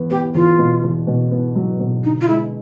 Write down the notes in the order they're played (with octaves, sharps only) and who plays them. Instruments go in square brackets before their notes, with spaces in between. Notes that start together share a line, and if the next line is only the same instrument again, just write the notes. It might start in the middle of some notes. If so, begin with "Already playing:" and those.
Already playing: [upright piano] E2 B3
[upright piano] B3 [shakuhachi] G4
[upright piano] E2 [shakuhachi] F4
[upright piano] B2
E2
B2
B3
F#3
B2
[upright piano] D3 [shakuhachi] D#4
[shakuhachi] F4
[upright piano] G#3 [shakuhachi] E4